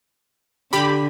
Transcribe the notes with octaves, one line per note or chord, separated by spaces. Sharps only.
D3 G4 B5